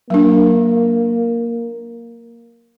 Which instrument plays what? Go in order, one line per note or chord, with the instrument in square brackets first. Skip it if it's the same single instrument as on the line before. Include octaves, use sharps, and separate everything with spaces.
[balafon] F#3 D4 [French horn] A#3